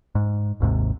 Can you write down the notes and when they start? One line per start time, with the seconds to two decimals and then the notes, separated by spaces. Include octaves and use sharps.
0.15 G#2
0.60 G#1 D#2 G#2 C3